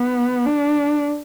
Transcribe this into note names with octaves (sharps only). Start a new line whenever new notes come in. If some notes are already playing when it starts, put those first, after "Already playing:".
Already playing: B3
D4